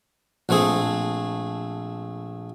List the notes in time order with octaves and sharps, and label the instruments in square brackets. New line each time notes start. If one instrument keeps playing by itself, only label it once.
[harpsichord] A#1 A3 C4 G#4